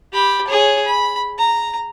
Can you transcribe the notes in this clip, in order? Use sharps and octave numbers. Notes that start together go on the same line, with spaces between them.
G4 B5
G#4 C#5
B5
A#5